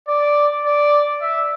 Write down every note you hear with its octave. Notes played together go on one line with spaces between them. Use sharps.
D5
D5
E5